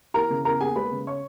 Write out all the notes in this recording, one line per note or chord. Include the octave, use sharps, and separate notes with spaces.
E3 A#4 A#5
C#3
E2 A#4 A#5
A#3 G#4 G#5
G#3 B4 B5
C#3
C#5 C#6